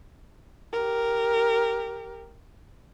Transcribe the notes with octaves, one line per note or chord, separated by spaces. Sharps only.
G4 A#4